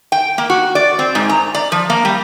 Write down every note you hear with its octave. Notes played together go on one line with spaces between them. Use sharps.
G5
A#3
F#4
D5
C4
G#2
A#5
D5
F3
A#3
G3